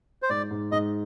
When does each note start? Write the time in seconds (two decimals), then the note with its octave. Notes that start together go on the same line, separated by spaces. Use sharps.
0.22 C5
0.30 G#2 D5
0.51 G#2
0.72 G#2 D#5